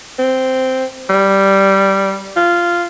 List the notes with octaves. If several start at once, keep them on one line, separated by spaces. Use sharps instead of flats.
C4
G3
F4